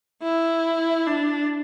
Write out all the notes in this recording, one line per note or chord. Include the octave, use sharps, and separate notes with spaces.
E4
D4